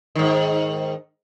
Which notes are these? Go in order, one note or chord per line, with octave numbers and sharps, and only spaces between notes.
G#2 D#3